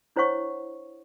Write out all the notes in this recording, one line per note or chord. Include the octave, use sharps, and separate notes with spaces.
D4 E4 C5 C#5 F#5 C#6